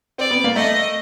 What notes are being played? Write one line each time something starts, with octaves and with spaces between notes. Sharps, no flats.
C4 D5
B3
A#3
A3 D#5